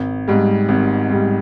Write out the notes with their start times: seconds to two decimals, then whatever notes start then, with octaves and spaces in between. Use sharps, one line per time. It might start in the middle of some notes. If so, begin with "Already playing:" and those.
Already playing: G#1
0.28 G#2 G3
0.68 G#1
1.10 G#2 G3